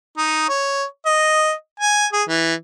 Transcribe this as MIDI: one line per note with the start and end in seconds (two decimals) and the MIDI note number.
0.18 0.48 63
0.49 0.84 73
1.06 1.52 75
1.80 2.06 80
2.13 2.23 68
2.28 2.54 52